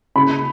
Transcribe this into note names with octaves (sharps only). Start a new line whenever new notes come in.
C#3 B5